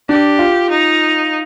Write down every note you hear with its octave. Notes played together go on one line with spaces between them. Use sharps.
D4 G4
F4
D#4